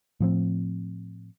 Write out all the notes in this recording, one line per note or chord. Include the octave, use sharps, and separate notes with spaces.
A2 F3 C4